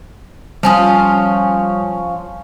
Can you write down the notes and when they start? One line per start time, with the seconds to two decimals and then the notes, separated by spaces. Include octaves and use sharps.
0.63 F3 G3 C#4 F4 D#6